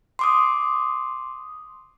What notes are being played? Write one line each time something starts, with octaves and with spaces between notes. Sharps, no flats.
C6 D6 D#6